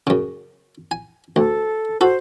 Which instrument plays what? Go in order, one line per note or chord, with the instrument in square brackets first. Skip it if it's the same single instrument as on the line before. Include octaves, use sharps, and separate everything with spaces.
[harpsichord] F#2 C#3
G#5
[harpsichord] D2 [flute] A4
[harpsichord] F#4 A4 [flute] C5